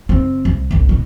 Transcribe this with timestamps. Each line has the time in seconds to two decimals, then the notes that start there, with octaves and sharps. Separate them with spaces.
0.09 F#1 C4
0.45 C2
0.71 G1 C2
0.89 B2